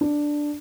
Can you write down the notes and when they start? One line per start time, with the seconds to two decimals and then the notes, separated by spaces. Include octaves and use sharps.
0.01 D4